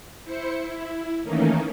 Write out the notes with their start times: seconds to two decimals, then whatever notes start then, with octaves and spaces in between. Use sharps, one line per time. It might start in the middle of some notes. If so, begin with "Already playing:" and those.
0.24 E4 C5 C#7
0.58 E4
1.23 D#3 E3 A3 A#3 C#4 D#4